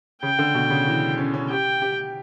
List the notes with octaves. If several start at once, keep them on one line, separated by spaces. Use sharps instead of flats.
C#3 G5
D3
B2
C#3
E3
C#4
C#4
G4 G5
G4